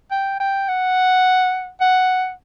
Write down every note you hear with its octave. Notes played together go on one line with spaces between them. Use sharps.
G5
G5
F#5
F#5